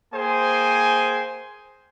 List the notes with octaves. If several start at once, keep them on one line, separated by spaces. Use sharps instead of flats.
A#3 G#4 C5 G5 G#5